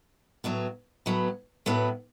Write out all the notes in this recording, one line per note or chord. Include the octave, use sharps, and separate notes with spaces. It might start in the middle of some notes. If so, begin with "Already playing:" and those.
A2 F#3 B3
A2 F#3 B3
A2 F#3 B3